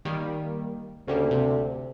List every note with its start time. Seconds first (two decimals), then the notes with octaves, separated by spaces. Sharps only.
0.05 D#3 G3 A#3
1.08 D2 C#3 G3 A#3
1.31 C3